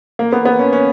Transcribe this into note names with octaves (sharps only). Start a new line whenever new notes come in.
A#3
B3
B3
C#4
C#4